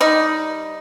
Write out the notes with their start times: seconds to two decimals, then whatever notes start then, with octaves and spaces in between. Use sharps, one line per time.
0.01 G3 D#4